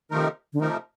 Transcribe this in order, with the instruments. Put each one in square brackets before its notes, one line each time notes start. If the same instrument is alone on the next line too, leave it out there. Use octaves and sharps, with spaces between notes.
[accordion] C3 F3 A3 D#4 A#4 [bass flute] D#3
[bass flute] D3
[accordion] C3 F3 A3 D#4 A#4 [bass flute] D#3